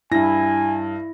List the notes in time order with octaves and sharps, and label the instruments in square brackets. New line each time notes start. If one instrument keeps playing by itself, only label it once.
[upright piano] G2 A#6 [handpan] E4 [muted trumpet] G#5